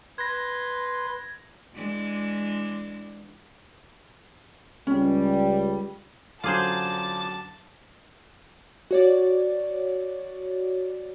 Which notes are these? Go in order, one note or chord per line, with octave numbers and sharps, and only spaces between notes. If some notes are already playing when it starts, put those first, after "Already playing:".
B4 C6 G#6 A#6
E3 G#3 D4
C#2 G3 C#4
F#2 D3 F#3 F4 G#4 C5 A5 D6
F#4 C#5 D5